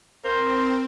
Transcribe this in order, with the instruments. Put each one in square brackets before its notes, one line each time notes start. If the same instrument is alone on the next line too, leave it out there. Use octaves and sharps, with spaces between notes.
[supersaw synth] C4 [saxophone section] A#4 C5